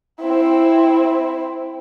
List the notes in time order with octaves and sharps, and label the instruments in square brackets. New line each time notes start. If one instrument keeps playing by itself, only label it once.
[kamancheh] C4 E4